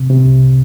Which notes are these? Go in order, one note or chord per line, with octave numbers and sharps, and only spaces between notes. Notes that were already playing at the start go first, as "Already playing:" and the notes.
Already playing: C3
C3
C2